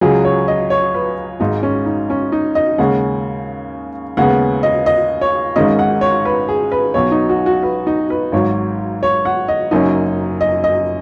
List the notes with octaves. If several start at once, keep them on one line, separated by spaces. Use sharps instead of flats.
C#2 C#3 F#3 G#4
C#5
D#5
C#5
B4
G#1 G#2 G#3 D#4
C#4
D#4
C#4
D#4
D#5
D#2 C#3 G#3 C#4 F#5
D#2 C#3 G#3 B3 F#5
D#5
D#5
C#5
G#1 G#2 D#3 G#3 C#4 D#5
F#5
C#5
B4
G#4
B4
B1 B2 F#3 C#5
D#4
F#4
F#4
B4
D#4
B4
G#1 G#2 F#3 C#5
C#5
F#5
D#5
F#1 F#2 F#3 C#4 D#4
D#5
D#5